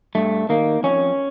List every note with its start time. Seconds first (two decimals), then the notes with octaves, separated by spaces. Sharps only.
0.15 G2 A3
0.49 D#3 A#3
0.83 F2 C#4